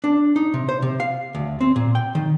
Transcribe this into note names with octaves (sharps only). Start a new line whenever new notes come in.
D4
D#4
C3
C5
C3
F5
D2
C4
A#2
G5
D#3